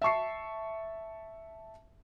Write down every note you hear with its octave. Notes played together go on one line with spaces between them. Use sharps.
E5 A5 C#6 C7